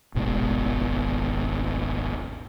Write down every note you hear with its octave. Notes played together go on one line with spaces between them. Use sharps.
D#1 G#1 G#2 B2